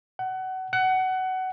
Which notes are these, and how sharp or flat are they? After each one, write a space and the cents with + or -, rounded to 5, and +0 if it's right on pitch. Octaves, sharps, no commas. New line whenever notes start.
F#5 +25
F#5 +20